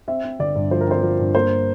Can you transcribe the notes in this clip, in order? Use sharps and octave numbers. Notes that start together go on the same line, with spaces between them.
C4 E5
C4
G1 D5
G2
F3 C5
A#4
C4 C5
F3 A#4
G2
A#3 C5